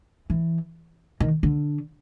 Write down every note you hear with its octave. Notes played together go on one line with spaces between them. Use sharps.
E3
D#3
D3